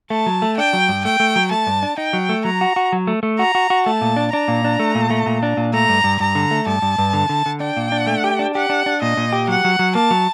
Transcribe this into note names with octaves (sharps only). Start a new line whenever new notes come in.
A3 A5
F#3
A3
D4 G5
F#3
G2
A3 G5
A3
F#3
A3 A5
G2
D4
D#4 G5
F#3
A3
F#3 A#5
F#4
F#4
F#3
A3
A3
F#4 A#5
F#4
F#4
A3 A5
A#2
D4
D4 A#5
A#2
D4
A3
A#2
A3
A#2
D4
A#2
A3 A#5
G2
G2
G2 A#5
D3
A3
G2 A5
G2
G2
D3
D3
D3
D4 G5
A#2
D4
A3
G4
D4
G4 F#5
D4
D4
A#2 D#5
A#2
G4
F#3 F#5
F#3
F#3
A#3 A5
F#3